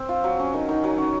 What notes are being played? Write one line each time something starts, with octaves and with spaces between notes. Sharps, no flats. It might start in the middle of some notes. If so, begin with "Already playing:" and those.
Already playing: C4
F4
F#3
C#4
D#3
D#3
F#3
C#4